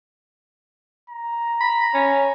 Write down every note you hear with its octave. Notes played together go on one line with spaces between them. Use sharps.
A#5
B5
C#4